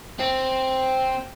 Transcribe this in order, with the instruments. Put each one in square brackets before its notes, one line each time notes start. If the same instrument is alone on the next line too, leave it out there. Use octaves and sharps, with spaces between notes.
[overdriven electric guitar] C4